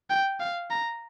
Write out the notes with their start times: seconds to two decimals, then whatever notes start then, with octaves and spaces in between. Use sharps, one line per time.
0.10 G5
0.40 F5
0.70 A#5